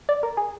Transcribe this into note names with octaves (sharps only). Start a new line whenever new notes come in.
D5
A#4
G#4